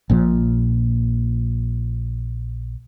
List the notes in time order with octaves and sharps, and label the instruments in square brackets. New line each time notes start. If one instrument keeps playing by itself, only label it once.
[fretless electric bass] A#1 A#2 F3